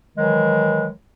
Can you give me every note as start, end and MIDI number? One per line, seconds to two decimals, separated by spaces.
0.17 0.89 51
0.17 0.89 52
0.17 0.89 54
0.17 0.89 56